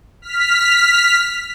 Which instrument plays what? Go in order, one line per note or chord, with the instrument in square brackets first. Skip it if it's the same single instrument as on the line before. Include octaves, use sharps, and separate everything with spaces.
[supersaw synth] F6 B6